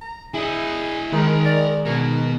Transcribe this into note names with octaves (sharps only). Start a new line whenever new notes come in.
A#5
E4 G#4 D#5
D#3 G#3 A#4 B5
D5
B2 A#4